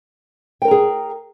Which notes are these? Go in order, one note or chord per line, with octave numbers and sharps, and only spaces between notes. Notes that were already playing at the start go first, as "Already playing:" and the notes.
G#4 A#4 G5 A#5